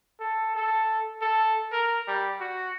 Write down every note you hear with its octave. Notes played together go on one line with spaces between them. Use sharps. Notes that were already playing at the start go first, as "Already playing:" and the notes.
A4
A4
A4
A#4
G3
F#4